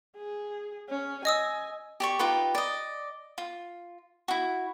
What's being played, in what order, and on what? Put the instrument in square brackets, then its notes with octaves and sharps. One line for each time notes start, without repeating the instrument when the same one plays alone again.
[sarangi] G#4
C#4
[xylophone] D#5 D#6 E6 [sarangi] G#5
[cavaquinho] G4 D5 C#6
D#4 F4 G4 B4
D5 D#5
F4
E4 F#4